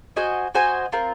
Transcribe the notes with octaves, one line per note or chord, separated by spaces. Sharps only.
F#4 C5 D#5 G#5
F#4 C5 D#5 G#5
C4 F4 A#4